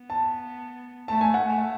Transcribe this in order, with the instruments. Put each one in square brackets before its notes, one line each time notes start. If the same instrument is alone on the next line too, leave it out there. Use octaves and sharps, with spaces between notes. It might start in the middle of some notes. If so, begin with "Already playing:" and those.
Already playing: [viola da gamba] B3
[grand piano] A5
[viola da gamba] A3 [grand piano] A5
[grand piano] G#5
F#5
[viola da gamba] A3